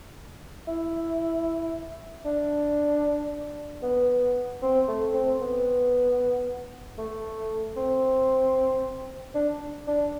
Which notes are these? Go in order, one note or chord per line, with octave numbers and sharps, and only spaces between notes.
E4
D4
B3
C4
A3
C4
B3
A3
C4
D4
D4